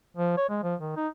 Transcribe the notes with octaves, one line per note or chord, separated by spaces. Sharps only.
F3
C#5
G#3
F3
D#3
D#4